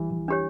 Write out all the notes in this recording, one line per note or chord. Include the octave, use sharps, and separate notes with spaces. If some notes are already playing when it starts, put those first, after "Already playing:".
Already playing: E3 G3
E3
D4 G4 C#5